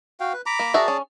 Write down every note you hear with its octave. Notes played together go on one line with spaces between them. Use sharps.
F#4 F5 G5
B4
A#5 B5 D6
A#3
F#4 G#4 A#4 D5 E5 A5
C#4